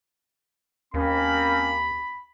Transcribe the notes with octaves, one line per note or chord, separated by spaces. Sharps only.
D#2 A#3 C4 C#4 B5